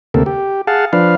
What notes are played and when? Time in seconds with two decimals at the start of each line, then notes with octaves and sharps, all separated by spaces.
0.14 D2 C3 A#3 A4
0.26 G4
0.67 G#4 F5 F#5 A5
0.93 F3 D4 B4 F5